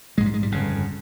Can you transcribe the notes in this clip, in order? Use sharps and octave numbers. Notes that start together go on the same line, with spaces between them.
A#1 G#2 G#3
G3
G#3
G3
G1 F2 C#3